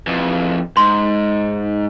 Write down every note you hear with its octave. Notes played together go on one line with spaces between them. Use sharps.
F2 E3
G#2 C6